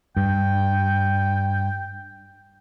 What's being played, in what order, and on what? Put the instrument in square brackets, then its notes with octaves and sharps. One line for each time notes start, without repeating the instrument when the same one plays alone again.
[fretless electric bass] G2 [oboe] G5